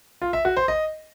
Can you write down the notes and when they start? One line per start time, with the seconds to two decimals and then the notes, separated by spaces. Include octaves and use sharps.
0.22 F4
0.33 E5
0.45 F#4
0.57 C5
0.68 D#5